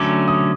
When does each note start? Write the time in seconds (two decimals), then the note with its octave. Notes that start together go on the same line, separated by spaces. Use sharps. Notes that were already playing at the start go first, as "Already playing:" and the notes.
Already playing: D3 F#3 A3 C#4 D6
0.28 D#6